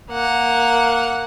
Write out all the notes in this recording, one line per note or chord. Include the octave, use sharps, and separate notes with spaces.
A#3 F#5